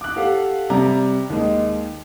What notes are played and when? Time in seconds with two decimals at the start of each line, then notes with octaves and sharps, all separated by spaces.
0.01 D6 F#6
0.16 G4 A4 F5 F#5
0.70 C3 G3 A#5
1.30 D#2 G#3